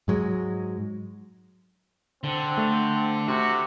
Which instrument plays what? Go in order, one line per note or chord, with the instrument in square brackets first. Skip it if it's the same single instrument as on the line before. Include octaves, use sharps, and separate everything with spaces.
[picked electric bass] G#2 F#3 G#3
[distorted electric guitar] D3 [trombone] C4
[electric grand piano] A3
[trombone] C3 [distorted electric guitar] F#4